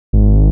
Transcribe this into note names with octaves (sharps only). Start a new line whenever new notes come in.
G#1